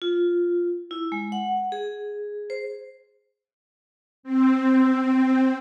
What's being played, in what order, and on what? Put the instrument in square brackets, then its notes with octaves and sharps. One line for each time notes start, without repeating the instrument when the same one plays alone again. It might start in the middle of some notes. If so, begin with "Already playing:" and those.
[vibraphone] F4
E4
G#3
F#5
G#4
C5
[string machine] C4